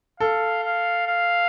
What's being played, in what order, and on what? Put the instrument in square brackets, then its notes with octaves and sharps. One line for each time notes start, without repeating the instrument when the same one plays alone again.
[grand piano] A4 [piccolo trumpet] F5
[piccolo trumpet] F5
F5